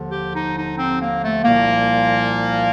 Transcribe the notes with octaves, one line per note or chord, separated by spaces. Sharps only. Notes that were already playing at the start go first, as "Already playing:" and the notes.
Already playing: D#2 D3 F3
G4
D#4
D#4
C4
A#3
A3
C2 A#2 F3 A#3